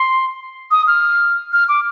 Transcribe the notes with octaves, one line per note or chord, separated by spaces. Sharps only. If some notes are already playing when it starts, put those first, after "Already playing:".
Already playing: C6
D#6
F6
F6
D6